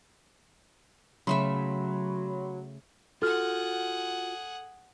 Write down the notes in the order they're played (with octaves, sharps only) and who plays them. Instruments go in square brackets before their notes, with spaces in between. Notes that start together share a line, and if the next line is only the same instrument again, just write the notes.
[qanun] C#3 A3 E5 [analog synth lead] F#3 [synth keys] B5 C6
[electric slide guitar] F4 F#4 [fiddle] G#4 F#5 [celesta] A4 F6